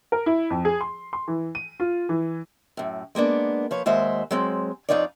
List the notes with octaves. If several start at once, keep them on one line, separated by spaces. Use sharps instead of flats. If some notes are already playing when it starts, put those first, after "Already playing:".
A#4
E4
F2
G#4
C6
C6
E3
D#7
F4
E3
F#2 A2
G#3 A#3 B3 D4
F3 B4 C#5
D#2 G#3 F#4 C5 E5
F#3 G#3 C4
F2 E3 D#4 F4 C#5 D5